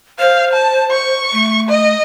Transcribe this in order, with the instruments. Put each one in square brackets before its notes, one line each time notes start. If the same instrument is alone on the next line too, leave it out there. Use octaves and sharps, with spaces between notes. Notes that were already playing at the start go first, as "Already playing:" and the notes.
[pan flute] C5 [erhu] F5
[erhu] A5
C#6
[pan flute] A3
[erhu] D#5